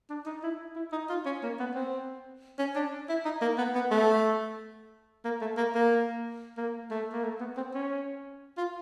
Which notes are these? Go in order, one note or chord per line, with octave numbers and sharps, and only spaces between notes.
D4
D#4
E4
E4
D#4
F4
C#4
A#3
B3
C4
C#4
D4
E4
D#4
A#3
B3
B3
A3
A#3
A3
A#3
A#3
A#3
A3
A#3
A3
B3
C4
C#4
F4